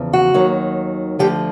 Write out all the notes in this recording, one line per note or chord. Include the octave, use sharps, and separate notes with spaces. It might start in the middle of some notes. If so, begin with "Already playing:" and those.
Already playing: E2 C#3 F3
F#4
D#2 D#3 F#3
D2 D3 F3 G4